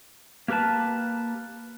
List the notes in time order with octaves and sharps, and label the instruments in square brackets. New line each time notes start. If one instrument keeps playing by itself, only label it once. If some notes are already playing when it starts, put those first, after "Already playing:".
[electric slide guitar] A#3 G4 A#4 B4 A5